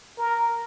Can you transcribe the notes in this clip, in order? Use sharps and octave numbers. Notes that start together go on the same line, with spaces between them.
A#4